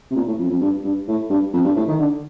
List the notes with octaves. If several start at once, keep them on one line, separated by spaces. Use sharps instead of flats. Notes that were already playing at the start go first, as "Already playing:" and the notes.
C3
A#2
A2
F2
F2
G2
G2
A2
G2
F2
G2
A2
D#3
D3